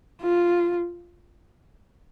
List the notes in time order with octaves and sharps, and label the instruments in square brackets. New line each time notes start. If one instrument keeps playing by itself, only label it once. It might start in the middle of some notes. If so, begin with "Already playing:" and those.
[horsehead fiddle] F4